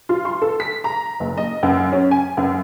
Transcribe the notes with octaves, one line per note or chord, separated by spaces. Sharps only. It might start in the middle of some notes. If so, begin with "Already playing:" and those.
F4
C6
A4
B6
A#5
F#1
D#5
F#2
C#4
G#5
F#2